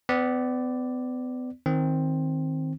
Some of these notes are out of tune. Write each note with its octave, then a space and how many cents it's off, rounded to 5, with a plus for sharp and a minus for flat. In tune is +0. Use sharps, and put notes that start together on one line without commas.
B3 +40 D5 +0
D#3 +10 C4 +5